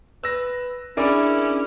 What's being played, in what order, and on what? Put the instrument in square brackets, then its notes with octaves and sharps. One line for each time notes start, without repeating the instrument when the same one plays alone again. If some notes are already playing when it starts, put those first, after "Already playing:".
[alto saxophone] B4 [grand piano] E6 A#6
[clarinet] C#4 [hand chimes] D4 G#4 B5 [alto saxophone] E4 [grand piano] A#4 D5 D6